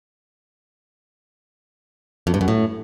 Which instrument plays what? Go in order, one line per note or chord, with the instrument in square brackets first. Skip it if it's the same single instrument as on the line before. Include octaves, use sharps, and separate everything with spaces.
[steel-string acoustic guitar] F2
G2
F#2
A2